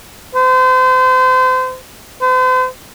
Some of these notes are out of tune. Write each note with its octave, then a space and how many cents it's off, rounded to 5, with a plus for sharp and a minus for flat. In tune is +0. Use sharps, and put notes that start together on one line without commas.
C5 -35
C5 -45